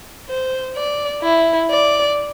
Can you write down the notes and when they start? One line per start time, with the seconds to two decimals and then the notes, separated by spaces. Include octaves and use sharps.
0.29 C5
0.76 D5
1.23 E4
1.70 D5